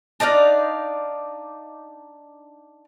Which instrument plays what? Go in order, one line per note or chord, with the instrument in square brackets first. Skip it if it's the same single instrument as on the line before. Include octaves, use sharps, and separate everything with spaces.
[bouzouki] D4 D#4 D5 F5